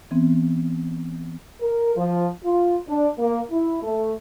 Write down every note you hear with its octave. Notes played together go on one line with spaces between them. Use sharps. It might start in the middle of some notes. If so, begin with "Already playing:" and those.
E3 B3 C4
A#4
F3
F4
D4
A#3
E4
A3